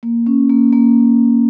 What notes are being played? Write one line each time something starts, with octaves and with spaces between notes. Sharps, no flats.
A#3
C#4
A#3
A#3